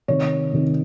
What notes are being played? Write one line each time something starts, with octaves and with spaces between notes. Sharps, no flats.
C3 D#3 C#5
C3 D#3